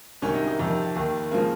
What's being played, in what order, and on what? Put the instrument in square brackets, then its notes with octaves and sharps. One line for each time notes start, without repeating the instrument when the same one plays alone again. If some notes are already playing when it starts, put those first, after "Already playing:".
[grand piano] C2 C3 D#3 C#4
D#4
D#4
F2 C3 D#3
D#2 D#3
C#3 F3 A#3